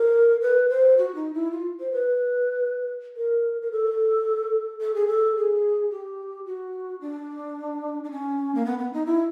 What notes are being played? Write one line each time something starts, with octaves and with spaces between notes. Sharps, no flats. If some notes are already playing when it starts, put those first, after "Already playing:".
Already playing: A#4
B4
C5
F#4
D#4
E4
F4
C5
B4
A#4
A#4
A4
A4
G#4
A4
G#4
G4
F#4
D4
D4
C#4
A#3
B3
B3
D#4
E4